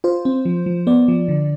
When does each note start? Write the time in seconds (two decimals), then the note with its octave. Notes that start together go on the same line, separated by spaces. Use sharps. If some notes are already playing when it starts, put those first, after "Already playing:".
0.04 F4 C5
0.25 C4
0.45 F3
0.66 F3
0.87 B3 D5
1.08 F3
1.28 D3